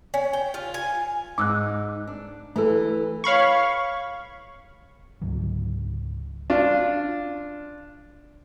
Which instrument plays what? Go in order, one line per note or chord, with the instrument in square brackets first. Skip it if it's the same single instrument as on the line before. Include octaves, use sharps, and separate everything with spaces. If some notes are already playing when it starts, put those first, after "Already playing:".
[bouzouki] C#4
G5
F4
G#5
[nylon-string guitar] G#2 D#4 [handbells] D6 E6 F#6
[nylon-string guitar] D4
[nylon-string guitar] E3 E4 [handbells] A3 A4
[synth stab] C#5 F5 B5 C#6
[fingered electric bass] C#2 G#2 D3 F#3
[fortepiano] D4 F4